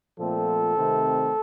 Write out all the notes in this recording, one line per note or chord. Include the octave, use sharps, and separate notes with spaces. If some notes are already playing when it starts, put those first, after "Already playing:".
A#2 F3 A3 C4 A4
C3 D#3 A3 C4